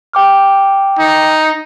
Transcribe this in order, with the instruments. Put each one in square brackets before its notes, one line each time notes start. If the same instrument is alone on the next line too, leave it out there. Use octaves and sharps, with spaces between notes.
[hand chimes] G5 D6 F6
[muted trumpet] D#4